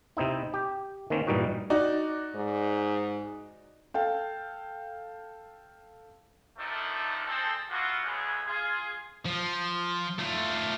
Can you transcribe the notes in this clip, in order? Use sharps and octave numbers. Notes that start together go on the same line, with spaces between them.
C3 C4 D#4 E4
G4
D#3 A#3 C4 C#4
G2 A#2 E3 G3 D#4 F#4
D#4 F#4 D5
G#2
A4 F5 G5
F#2 D3 D#3 F3 A3 D#4
G#3 C4 A4
E3 F3 A#3 F4 F#4
C#2 G#3 A3 B3 C#4 G#4
F4 G#4
F3
A3 F4